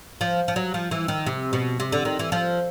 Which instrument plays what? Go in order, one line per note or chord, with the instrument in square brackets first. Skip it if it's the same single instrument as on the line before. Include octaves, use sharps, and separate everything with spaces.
[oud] F3
F3
F#3
F3
E3
D#3
C3
B2
C3
D3
D#3
E3
F3